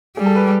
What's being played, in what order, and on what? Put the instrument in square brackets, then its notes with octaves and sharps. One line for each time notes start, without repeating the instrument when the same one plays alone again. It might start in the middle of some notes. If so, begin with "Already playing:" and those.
[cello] G3 [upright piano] G#4
[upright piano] A4
B4